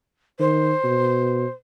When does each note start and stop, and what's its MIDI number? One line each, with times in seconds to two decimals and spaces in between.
0.40 0.73 51
0.40 1.51 72
0.84 1.45 47